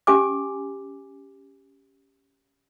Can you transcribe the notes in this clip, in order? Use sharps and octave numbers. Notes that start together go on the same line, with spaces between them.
C#4 G4 G#5 D6